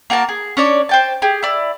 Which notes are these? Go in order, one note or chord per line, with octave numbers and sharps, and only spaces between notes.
A#3 F#4 A#4 A5
G#4
C#4 D4 C#5 D5
C5 G5 A5
G4 G#4
E4 D5